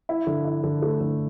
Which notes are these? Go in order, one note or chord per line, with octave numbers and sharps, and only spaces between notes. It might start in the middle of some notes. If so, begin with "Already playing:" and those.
E4
D3
E4
D3
A3
D3